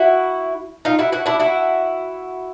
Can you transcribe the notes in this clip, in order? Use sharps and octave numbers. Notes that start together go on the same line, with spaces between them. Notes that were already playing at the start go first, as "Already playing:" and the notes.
Already playing: E4 F#4
D#4 F4
E4 F#4
E4 F#4
D4 E4
E4 F#4